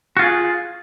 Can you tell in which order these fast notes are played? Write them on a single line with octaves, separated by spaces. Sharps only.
F#4 F4 G#4